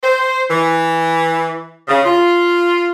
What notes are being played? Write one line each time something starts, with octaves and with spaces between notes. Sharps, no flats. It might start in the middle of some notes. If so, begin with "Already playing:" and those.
C5
E3
C#3
F4